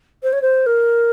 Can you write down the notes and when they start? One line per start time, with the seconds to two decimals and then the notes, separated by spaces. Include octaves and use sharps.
0.23 C5
0.33 C#5
0.42 C5
0.66 A#4